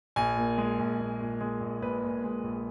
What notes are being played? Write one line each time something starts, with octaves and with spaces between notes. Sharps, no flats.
A#1 G#5
A#2
G#3
A#1
A#1
A#2
G#3
A#1
A#1 B4
A#2
G#3
A#1